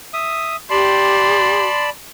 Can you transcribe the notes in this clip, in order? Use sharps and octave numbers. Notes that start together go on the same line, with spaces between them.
E5 D#6
G4 D5 A5 B5 C6